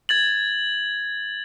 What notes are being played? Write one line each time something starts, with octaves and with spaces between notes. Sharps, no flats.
G#6 A6 F#7